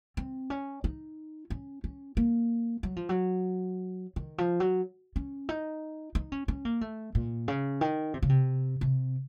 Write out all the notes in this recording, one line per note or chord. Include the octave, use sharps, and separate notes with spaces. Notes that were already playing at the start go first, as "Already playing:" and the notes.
C4
C#4
D#4
C#4
C#4
A#3
F#3
F3
F#3
D#3
F3
F#3
C#4
D#4
D#4
C#4
C#4
A#3
A3
A#2
C#3
D#3
C3
C#3
C3
C3